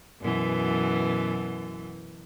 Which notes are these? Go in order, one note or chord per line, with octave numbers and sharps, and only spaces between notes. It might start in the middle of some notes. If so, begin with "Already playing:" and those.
F#2 B2 E3